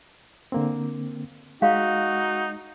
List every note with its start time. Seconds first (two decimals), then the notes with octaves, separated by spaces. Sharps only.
0.52 D3 A#3 C4
1.62 G#3 D#4 F#4 F5